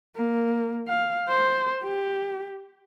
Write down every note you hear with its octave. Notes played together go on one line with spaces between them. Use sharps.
A#3
F5
C5
G4